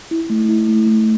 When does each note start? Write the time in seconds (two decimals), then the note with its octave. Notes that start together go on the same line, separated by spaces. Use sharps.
0.11 E4
0.30 A3
0.49 E4
0.69 A3
0.87 A3